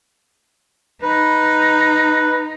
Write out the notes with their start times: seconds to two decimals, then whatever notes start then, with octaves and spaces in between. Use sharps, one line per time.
1.02 D#4 B4